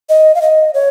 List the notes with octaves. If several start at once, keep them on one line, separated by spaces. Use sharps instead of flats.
D#5
F5
D#5
C#5